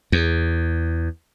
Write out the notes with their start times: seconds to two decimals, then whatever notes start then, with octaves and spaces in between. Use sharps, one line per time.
0.12 E2